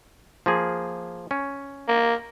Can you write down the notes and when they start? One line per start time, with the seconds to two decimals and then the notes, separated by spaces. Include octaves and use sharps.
0.46 F3 A#3 G#4
1.31 C#4
1.88 A#3